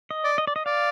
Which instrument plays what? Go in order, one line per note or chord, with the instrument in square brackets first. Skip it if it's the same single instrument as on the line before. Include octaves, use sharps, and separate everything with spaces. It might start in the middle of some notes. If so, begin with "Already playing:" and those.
[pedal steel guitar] D#5
[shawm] D5
[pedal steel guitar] D#5
D5
D#5
[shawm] D5 [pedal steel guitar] F5